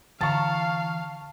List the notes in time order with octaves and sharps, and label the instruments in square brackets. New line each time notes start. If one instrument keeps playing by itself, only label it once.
[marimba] D3 A6 [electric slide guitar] E3 F#5 A#5 [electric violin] F5 [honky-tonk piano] A5 C#6